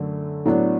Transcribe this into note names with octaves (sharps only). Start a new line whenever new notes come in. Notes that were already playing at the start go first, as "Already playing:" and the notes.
Already playing: F#2 D3 A3
A2 F#3 B3 D4